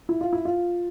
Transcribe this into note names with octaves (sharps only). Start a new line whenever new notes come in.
E4
F4
E4
F4